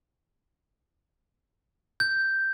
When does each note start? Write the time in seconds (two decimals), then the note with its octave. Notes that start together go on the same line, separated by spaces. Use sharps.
2.00 G6